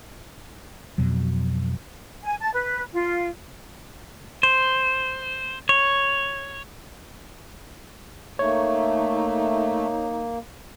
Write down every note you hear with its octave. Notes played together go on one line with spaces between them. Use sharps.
F2 B2 F#3
G#5
A5
B4
F4
C5
C#5
A3 A#3 D#4 C#5